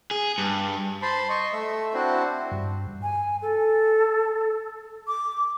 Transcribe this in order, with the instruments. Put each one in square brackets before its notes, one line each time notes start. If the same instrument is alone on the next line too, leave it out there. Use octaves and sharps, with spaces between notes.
[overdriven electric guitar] G#4
G2
[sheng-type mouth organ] C5 A5 B5 C6
D#5 C6 C#6
A3 E5
C4 D4 E4 F#4 C5
[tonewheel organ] G2
[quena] G#5
A4
D6